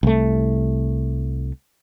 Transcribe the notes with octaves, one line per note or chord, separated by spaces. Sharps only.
C2 A3